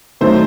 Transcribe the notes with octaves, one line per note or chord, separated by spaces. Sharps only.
D#3 F#3 A3 C5